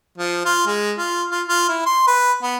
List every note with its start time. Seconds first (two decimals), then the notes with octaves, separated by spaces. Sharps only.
0.18 F3
0.45 F4
0.66 G#3
0.98 F4
1.31 F4
1.48 F4
1.68 E4
1.86 C6
2.07 B4
2.42 B3